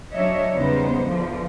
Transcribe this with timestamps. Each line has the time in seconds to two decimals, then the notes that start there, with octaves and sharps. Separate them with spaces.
0.13 F#3 D4 C#5 D#5 E5
0.54 E2 C#3 G3 B3 D#4 C5
1.03 E2 D3 F3